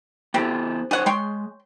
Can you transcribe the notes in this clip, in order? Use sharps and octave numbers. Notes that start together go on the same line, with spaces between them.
B3 C4 E4 G4 A4
D#4 G#4 C5 C#5 F#5
G#3 C#5 G5 C6